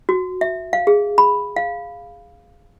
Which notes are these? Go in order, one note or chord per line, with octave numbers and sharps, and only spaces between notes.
F#4
E5
F5
G#4
B5
F5